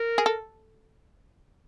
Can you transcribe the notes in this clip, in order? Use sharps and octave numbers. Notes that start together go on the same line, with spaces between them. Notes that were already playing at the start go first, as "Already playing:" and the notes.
Already playing: A#4
G#4
A4